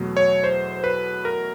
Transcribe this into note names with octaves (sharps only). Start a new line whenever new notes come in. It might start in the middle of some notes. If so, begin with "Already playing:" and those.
Already playing: E2 B2 F#3 A3
C#5
C5
B4
A#4